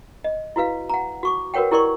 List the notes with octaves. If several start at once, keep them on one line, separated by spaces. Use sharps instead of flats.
D#5
E4 F#4 B4 F5
F#5 A#5
F#4 C#6 D6
F#4 A#4 B4 C#5 F#5 G5
E4 G4 A#4 D5 C6 C#6